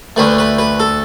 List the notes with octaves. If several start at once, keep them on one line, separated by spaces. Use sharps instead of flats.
D2 D3 A3 B4
B4
B4
A4